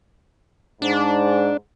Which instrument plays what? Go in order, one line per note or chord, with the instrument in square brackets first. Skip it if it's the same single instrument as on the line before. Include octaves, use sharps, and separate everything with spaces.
[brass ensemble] G#2 [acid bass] D4